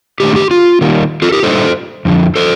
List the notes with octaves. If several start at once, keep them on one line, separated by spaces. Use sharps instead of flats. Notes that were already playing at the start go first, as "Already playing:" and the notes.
D#3 A3 D4 G4
G4
F4
D#3 G3 A#3
F4 A4
G4 A#4
D3 G3 A#3 D#4 A4 C5
F2 D3 F3
A4 C5